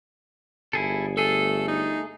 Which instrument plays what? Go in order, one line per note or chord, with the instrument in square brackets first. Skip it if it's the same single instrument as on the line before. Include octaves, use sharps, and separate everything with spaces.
[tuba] G1 [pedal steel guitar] E4 G#4 A4
[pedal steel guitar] A3 G#4 [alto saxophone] A4
[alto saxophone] D#4